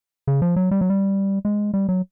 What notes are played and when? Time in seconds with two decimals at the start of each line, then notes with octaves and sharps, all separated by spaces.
0.27 C#3
0.42 F3
0.56 F#3
0.71 G3
0.81 F#3
0.90 G3
1.45 G#3
1.74 G3
1.89 F#3